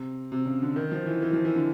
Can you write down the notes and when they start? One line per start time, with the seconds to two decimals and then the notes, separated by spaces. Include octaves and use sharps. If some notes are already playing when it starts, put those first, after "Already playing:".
Already playing: C3
0.32 C3
0.46 C#3
0.62 D3
0.76 D#3
0.91 F3
1.06 E3
1.22 E3
1.33 F3
1.45 E3
1.55 D3